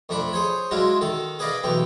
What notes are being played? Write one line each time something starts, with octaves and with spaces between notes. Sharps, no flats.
F2 A3 D4 B5
G#4 C5 C#5
F#3 G#3 D4 E4 F4
D#3 A4
G#4 B4 D5 D#5 F5
B1 E3 A3 G4